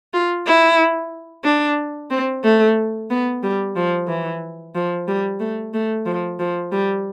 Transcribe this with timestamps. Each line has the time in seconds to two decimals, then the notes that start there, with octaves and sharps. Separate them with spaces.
0.13 F4
0.46 E4
1.44 D4
2.10 C4
2.44 A3
3.10 B3
3.43 G3
3.76 F3
4.08 E3
4.75 F3
5.08 G3
5.40 A3
5.74 A3
6.06 F3
6.39 F3
6.72 G3